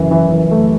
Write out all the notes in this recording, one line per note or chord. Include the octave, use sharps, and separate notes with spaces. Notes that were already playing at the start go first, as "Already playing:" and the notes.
Already playing: F#2 C#3 E3
E3
E3
A3